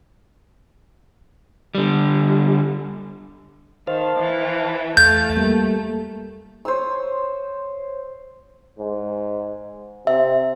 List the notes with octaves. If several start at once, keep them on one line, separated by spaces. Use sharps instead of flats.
D3 G3
D#3 C5 F5 A5
E3
E2 A3 F5 G6 A6
G3 A#3
C5 C#5 D#6 E6
G#2
C3 E5